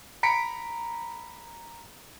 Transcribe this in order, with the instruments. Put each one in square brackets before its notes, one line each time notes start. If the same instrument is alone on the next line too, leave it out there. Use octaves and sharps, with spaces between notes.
[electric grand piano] A#5 B5 B6 C#7 D7